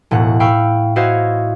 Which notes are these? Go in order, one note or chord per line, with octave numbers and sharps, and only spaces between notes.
E1 A2 F#5
F5 G5 B5 C#6 E6
E4 F#4 C5 C#5 D#5 F5